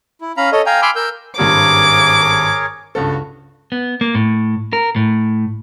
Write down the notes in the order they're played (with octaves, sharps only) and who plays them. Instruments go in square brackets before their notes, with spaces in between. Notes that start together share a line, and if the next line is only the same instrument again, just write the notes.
[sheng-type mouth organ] E4
C#4 F5 A#5 B5
A4 C#5 D#5
F5 G5 G#5 A#5
G#5 B5 C6 D6 E6 F6
A#4 E6 G6
[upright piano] G#1 G2 G3 [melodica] G#4 A#4 C#5 [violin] D6
[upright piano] C#2 G2 A4 [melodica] F#4
[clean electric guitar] B3
A#3
A2
A#4
A2